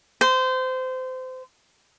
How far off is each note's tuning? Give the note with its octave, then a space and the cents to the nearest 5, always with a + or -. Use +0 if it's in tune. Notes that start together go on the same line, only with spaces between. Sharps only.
C5 -25